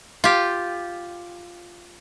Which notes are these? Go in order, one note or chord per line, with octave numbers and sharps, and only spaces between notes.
F4 G4